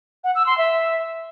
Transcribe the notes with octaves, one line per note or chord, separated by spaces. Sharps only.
F#5
E6
C6
E5